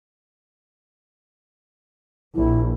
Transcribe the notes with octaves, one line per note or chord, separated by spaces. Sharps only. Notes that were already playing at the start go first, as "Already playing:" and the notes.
A#1 E4